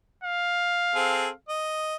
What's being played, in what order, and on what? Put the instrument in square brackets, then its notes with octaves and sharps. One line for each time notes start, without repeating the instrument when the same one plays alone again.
[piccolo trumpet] F5
[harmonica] C4 G#4 A4
D#5